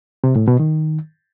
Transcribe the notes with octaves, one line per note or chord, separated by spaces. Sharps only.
C3
A2
B2
D#3